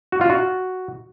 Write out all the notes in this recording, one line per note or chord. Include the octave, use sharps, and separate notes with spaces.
F#4
F4
F#4